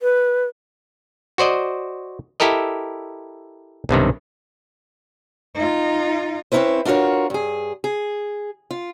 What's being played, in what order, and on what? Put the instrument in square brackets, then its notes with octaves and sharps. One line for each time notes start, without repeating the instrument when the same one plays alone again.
[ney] B4
[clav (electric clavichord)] F#4 C5 D5 D#5
E4 G4 A4 A#4 D#5
B1 G2 C3 D#3
[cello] D#4 F4
[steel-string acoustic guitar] C4 C#4 D#4 E4 B4 C5
D4 F4 F#4 A#4 C#5
G2 G#4
G#4
F4